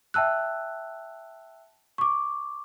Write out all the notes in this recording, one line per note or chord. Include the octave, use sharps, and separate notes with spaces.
E5 G5 A5 E6 F#6
C#6 D6